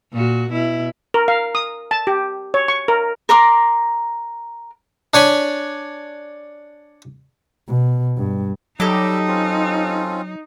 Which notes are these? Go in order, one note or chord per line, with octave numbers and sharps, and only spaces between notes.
A#2 F#4
B2 E4
A#4
F5
D#6
A5
G4
C#5
C#6
A#4
A#4 A#5 C6 D6
D4 C#5 G#5 B5
B2
G2
F#3 G3 D#4 G4 A4 D#5 D6 E6
C4 C#4 F4